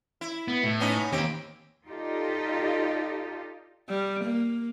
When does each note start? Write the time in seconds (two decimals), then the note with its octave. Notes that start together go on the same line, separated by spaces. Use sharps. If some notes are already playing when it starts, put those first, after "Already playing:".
0.21 E4
0.48 B3
0.63 A2
0.80 B3 C#4 D#4
1.12 D#2 C4 G4
1.87 D#4 F4 G4 A4 D5 D#5
3.89 G3
4.25 A#3